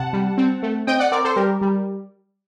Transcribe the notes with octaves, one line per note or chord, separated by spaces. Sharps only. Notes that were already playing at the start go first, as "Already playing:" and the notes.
Already playing: C3 F#5 A5
G3
C4
A3
C4 D#5 G5
D5 F#5
C4 A#4 D5
A4 C5
G3 G4 A#4
G3